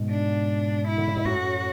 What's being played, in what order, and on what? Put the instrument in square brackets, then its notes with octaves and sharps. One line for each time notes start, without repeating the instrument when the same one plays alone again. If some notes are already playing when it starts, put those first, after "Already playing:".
Already playing: [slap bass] G#2 B2
[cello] D4
E4
[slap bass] D3
C#3
B2
[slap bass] F#2 A2 [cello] F#4